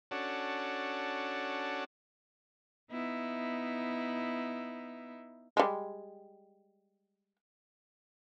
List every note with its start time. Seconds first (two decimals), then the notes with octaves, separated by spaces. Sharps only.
0.11 C#4 D4 F#4 A4
2.91 B3 D#4 E4
5.57 G3 G#3